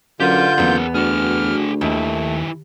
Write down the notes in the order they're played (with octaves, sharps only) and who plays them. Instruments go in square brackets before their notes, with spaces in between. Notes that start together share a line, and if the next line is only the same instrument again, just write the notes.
[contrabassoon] F#2 [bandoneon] D3 F4 G6 [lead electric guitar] G4 B4
[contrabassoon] F#1 [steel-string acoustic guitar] E2 B3 [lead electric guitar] G#4 A#4
[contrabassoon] D2 [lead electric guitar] F#4 G#4 [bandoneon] F6
[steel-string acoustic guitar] D#2 [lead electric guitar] D#3 E4 [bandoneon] A3